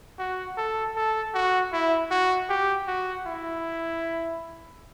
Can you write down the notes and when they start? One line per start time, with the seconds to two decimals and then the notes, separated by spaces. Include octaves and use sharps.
0.19 F#4
0.57 A4
0.96 A4
1.34 F#4
1.73 E4
2.11 F#4
2.49 G4
2.88 F#4
3.26 E4